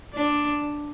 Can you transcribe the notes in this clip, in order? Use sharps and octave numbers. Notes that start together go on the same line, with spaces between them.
D4